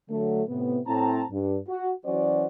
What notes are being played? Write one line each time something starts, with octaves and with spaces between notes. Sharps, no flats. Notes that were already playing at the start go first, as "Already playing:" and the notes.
D3 F#3 A3
A2 C3 B3
A2 C4 A5 A#5
G2
F#4
E3 F#3 C#4 F#4 C5 D5